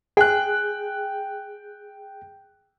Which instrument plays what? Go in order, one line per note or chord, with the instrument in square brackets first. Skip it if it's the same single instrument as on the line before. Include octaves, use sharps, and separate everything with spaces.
[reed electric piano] G#4 [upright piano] G5 F#6